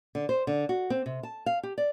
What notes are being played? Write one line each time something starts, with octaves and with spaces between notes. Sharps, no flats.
D3
C5
D3
F#4
C4
C3
A5
F5
G4
D5